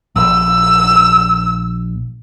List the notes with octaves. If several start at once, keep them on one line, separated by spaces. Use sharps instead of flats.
A#1 E6